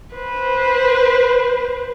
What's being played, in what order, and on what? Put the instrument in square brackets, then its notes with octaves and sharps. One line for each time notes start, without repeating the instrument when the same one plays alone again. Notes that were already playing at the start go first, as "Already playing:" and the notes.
[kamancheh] B4 C5